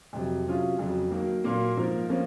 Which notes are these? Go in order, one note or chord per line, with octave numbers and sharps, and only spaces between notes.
F2 C3 F#3
C3 F#3 C#4 F4 G#4
F2 C#3 F#3
D#3 F#3 A#3
A#2 F#3 A#3
G#2 F3 A#3 F4 A#4
F3 A#3 C#4